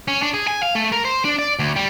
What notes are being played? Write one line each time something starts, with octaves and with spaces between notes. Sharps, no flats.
C#4
D4
G#4
G#5
F5
A3
A#4
C5
D4
D5
D2
G3